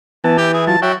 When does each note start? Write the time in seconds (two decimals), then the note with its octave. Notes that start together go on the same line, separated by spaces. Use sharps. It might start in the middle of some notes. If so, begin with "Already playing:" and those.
0.24 E3 B3 A5
0.38 E4 G4
0.54 G#4
0.67 F#3 F4 A5
0.82 F#3 F#4 E5 G5